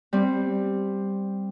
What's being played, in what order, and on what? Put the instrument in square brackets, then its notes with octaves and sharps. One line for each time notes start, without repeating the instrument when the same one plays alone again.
[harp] G3 C4